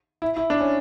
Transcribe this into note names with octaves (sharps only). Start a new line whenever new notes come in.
E4
E4
D4
C#4